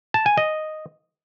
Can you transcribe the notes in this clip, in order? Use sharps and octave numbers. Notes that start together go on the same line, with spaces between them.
A5
G#5
D#5